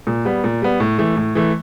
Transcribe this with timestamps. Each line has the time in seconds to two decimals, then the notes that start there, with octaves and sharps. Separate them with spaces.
0.07 A#2
0.25 G3 B3
0.44 A#2
0.62 G3 B3
0.80 A2
0.98 E3 A3
1.16 A2
1.35 E3 A3